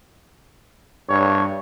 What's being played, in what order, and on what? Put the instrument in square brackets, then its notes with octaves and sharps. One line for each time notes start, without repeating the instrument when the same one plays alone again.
[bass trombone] G2 [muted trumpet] C#5